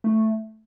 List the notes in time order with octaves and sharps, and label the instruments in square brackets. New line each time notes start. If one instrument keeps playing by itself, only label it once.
[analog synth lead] A3